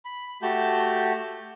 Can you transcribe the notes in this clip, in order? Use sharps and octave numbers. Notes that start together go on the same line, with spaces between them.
B5
A3 F#4 G4 A5 G6